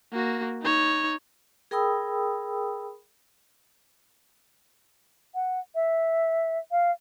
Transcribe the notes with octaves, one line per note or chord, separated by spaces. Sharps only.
A#3 F#4
D#4 C#5
G#4 A#4 G5 B5 D#6 E6
F#5
E5
F5